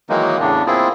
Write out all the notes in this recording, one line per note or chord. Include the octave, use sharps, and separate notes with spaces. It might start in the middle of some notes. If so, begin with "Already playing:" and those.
D#3 E3 F#3 G#3 A#3 D#4
E2 A2 C#3 D4
A#3 C4 E4 F4 G#4